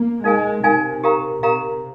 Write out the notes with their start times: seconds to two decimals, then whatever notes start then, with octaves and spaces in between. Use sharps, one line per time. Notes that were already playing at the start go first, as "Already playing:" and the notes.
Already playing: A#3
0.24 G#3 D#4 A#4 F5 G#5
0.63 C3 D#4 A#4 F5 G#5
1.04 G4 A#4 F5 A#5
1.43 C3 G4 A#4 F5 A#5